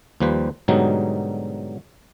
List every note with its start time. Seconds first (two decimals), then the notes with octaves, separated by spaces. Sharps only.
0.20 D#2 F3 G3 B4 C5
0.68 G#2 B2 D3 F#3 G3 D#4